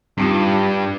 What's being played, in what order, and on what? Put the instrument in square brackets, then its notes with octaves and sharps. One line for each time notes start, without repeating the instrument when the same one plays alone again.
[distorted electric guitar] G2 [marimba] C4 D#4 F4 [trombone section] G4